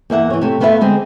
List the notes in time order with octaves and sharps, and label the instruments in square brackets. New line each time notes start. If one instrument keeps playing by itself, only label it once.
[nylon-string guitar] E2 A#3 E5 F#5
E3 C#5
C3 A3
A3 B3 F4 B4 C5 E5
D3 G#3 C4